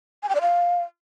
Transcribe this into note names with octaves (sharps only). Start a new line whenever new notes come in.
G#5
G5
D5
F5